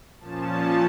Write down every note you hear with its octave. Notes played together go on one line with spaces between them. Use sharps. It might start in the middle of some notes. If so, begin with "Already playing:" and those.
A#2 F3 C#4 A5